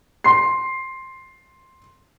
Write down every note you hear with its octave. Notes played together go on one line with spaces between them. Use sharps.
C6 C7